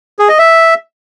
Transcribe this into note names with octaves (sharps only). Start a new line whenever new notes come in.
G#4
D#5
E5